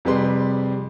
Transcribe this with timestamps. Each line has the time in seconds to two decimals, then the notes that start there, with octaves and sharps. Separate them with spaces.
0.05 F2 C3 G3 G#4 B4 C6